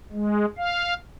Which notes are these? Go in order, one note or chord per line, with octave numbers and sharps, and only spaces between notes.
G#3
F5